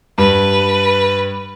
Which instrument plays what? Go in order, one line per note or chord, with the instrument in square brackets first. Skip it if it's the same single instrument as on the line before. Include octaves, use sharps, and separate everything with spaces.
[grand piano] G2 [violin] B4